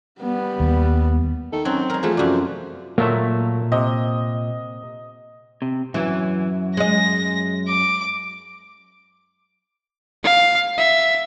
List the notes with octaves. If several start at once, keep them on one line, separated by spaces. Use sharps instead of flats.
G3 B3
D#2
D#3 A4
F#3 C4 C#4
G#3 A#4 A#5
E2 E3 F3 A3 G#4
F#2 C3 F#4 D5
A#2 F#3 A3 A#3 E5
C3 D#5
C3
F#2 E3 F#3 E5
G#3 D#5 A#6
D6
F5
E5